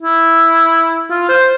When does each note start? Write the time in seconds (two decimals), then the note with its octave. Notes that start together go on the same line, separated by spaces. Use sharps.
0.03 E4
1.10 F4
1.29 C5